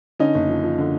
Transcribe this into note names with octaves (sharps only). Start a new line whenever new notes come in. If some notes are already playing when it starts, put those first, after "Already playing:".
D3 C#4 D#4
F#1
F3
F3
D3